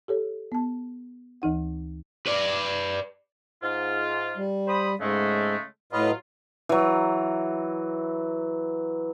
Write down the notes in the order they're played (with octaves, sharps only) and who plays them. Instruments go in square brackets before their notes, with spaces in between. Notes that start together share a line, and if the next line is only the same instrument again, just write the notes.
[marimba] G4 A4 C#5
B3 A5
D2 E3 D#4 F#5
[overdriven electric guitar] B4 D5
[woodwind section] G#2 F4
[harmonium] G3
[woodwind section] C5 B5 D#6
[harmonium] G#2 [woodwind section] C#3 G#3 A3
[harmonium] A2 B4 D#5 [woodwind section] F#3 F4
[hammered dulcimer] E3 F#3